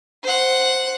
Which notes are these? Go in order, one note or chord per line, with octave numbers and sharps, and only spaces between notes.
C5 F#5